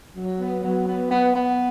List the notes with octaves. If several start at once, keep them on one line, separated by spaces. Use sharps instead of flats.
F#3
B3
F#3
B3
B3
B3